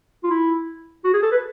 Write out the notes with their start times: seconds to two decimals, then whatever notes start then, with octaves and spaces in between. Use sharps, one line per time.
0.24 F4
0.30 E4
1.04 F#4
1.14 G#4
1.23 A4
1.32 B4